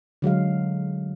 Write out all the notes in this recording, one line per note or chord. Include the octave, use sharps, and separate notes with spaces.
D3 F#3 G#3 F5